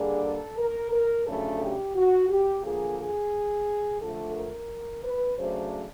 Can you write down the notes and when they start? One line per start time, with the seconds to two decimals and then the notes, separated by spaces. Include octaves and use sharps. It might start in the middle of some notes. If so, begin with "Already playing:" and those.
Already playing: D3 G3 A#3 D4 G#4
0.24 A4
0.58 A#4
0.92 A#4
1.27 F2 C#3 F#3 A3 D4 A4
1.61 G4
1.95 F#4
2.29 G4
2.63 D3 F3 A#3 G#4
2.98 G#4
4.01 D3 F3 A3 A4
4.35 A#4
5.03 B4
5.38 C#3 F#3 A3 D4 C5